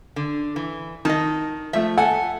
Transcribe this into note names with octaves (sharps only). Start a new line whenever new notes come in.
D3
E3
D#3 D#5 A5
F3 A3 E5
A4 F#5 G#5